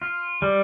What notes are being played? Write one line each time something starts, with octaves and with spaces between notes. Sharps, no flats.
F4
G3